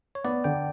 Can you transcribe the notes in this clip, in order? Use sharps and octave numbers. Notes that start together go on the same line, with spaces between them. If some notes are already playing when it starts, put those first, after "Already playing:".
C#5
B3 D5
D3 G5